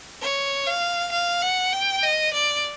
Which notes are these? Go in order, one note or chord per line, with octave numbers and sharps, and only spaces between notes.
C#5
F5
F5
F#5
G5
D#5
D5